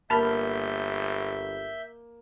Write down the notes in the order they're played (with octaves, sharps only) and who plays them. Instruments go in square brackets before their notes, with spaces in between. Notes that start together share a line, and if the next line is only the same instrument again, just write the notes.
[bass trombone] G1 [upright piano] A#3 [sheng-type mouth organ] E5 G6 [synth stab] A5 B5 F6